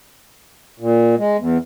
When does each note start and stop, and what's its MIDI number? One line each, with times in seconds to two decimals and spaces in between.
0.80 1.15 46
1.18 1.37 56
1.38 1.58 40